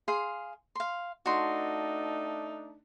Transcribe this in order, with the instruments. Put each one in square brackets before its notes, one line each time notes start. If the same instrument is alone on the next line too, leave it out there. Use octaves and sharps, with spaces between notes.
[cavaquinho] G#4 F5 C6
F5 C6
[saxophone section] A3 D4 D#4 [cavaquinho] F#4 C6